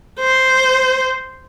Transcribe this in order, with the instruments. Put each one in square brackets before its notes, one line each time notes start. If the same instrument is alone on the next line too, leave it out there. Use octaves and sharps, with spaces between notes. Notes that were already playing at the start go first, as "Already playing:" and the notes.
[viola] C5